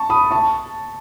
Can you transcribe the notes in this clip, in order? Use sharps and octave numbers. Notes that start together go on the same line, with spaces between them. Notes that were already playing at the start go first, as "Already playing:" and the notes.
Already playing: A5 C#6
B5 D#6
A5 C#6